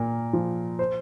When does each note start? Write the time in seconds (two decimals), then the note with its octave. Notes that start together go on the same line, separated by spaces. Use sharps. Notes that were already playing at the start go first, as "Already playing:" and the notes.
Already playing: A#2 A#4
0.33 F3
0.79 C5